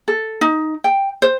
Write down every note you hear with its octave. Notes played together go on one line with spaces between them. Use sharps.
A4
D#4
G5
C5